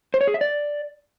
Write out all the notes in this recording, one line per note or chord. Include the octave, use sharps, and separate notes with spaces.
C5
C#5
G#4
E5
D5